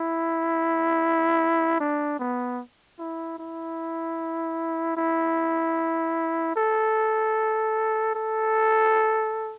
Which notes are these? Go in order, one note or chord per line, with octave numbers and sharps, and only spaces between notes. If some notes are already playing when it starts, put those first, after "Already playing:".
Already playing: E4
D4
B3
E4
E4
E4
A4
A4